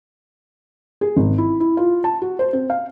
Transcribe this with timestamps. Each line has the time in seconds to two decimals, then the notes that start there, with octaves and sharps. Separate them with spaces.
1.01 G#4
1.17 G#1
1.38 E4
1.60 E4
1.77 F4
2.04 A5
2.22 F#4
2.39 C5
2.53 C4
2.70 F5